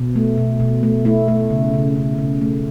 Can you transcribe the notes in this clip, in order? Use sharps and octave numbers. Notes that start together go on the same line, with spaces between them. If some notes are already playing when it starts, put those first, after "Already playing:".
Already playing: B2
A3
B2
B2
A3
A3 E4
A3
C#3
C#3
C#3
C#3
A3